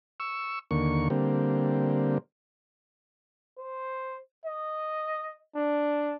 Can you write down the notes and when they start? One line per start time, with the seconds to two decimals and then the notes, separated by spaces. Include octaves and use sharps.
0.20 C#6 E6
0.71 D#2 D3 A#3 C#6
1.10 D3 G3 A#3 C4
3.59 C5
4.46 D#5
5.56 D4